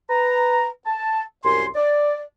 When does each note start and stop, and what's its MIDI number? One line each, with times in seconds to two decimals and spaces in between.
0.10 0.68 71
0.10 0.68 82
0.87 1.22 81
1.45 1.66 36
1.45 1.66 42
1.45 1.66 80
1.45 1.66 84
1.76 2.21 74